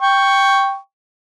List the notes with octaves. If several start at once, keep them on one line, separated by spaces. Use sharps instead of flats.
G5 C#6